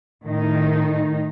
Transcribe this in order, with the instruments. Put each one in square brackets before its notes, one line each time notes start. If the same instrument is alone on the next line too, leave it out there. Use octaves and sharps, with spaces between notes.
[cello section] A2 D#3 D#4